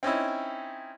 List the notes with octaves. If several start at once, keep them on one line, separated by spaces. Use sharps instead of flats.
C4 C#4 D#4 E4